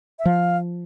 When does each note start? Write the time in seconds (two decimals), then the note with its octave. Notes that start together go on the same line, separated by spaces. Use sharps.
0.19 E5
0.25 F3 F5